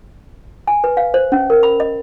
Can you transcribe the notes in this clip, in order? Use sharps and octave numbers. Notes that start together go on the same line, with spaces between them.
G#5
B4
F5
C5
C#4
A#4
B5
D#5